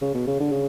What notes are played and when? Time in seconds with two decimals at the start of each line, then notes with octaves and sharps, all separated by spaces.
0.01 C#3
0.14 B2
0.27 C#3
0.40 D3
0.52 C#3